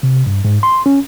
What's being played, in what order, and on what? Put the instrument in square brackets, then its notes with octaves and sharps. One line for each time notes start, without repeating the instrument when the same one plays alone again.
[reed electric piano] C3
G2
G#2
C6
C#4